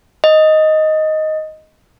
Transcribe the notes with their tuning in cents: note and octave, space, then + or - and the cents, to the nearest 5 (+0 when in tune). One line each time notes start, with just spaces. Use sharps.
D#5 +5